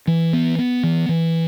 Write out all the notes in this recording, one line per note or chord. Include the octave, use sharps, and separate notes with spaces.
E3
B3
B3
E3
E3